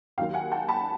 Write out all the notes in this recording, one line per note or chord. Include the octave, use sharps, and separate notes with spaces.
D#2 D#3 F#3 A#3 F5 G5
F#5 G#5
G5 A5
A5 B5